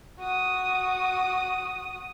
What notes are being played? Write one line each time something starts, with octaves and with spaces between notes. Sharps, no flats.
F#4 D#6